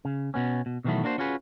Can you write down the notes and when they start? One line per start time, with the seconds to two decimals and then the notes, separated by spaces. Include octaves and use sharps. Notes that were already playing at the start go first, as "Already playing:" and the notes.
0.05 C#3
0.34 B2 B3 C#4
0.66 B2
0.84 B2 D#3 E3 F#3 A3 B3
1.04 A#3 D4 F#4 A#4 C5
1.18 C#4 F4 F#4 G#4 B4